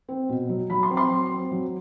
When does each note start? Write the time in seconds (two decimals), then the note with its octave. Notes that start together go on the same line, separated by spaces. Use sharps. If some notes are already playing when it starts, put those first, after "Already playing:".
0.08 C4
0.29 B2
0.49 F#3
0.70 F#3 B5
0.83 C6
0.90 C4
0.97 C6
1.11 F#3
1.31 C4
1.51 F#3